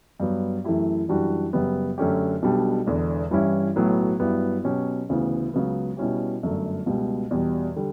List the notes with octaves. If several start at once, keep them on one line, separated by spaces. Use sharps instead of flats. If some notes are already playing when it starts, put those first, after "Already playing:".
G2 F#3 B3
F#2 E3 A3 E4 G4
F#2 E3 G3 D4 F#4
F#2 C#3 G3 B3
F#2 D3 A3 C#4 G4
B1 B2 G3 D4
E1 E2 D3
G2 E3 G3 C#4 E4
B1 A2 F#3 B3
G2 F#3 B3 E4 G4
B2 F#3 C#4 G4
D2 C#3 E3 B3
C#2 C#3 F#3 B3
B2 G3 C#4 E4 G4
G1 F#2 D3 A3
C#2 B2 G3
E2 B2 G3
D3 G3